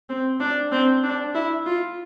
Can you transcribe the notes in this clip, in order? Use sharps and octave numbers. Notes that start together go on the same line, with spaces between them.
C4
D4
C4
D4
E4
F4